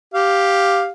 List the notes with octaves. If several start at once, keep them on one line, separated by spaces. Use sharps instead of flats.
G4 F5